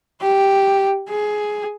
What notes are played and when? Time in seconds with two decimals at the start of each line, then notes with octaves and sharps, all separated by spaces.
0.22 G4
1.09 G#4